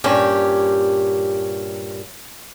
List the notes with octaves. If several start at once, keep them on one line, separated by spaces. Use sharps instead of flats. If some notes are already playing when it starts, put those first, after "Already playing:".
G2 A#2 C#4 G4